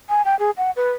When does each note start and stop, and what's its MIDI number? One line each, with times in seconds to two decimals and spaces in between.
0.09 0.24 80
0.25 0.38 79
0.39 0.51 68
0.57 0.71 78
0.76 0.92 71